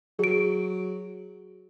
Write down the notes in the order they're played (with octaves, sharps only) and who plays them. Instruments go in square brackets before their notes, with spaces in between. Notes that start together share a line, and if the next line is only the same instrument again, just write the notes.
[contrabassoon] F#3 [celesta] G#4 D7